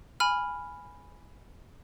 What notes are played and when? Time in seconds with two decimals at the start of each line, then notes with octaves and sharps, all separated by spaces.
0.20 G#5 B5 F6